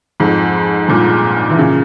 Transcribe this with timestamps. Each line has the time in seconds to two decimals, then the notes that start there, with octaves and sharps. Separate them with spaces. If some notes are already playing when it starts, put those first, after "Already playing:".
0.20 F2 G#2
0.88 G2 A#2
1.50 E3
1.58 A#2 C#3